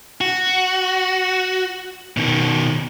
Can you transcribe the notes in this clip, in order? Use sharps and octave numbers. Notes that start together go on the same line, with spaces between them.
F#4
B2 D#3